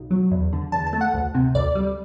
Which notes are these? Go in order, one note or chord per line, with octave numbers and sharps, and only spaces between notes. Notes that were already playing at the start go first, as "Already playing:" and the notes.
Already playing: B1
F#3
E2
D3
E2 A5
A5
A3
F#5
D2
C3
D2 D5
G3